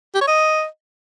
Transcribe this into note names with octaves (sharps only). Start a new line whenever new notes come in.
G4
C#5
D#5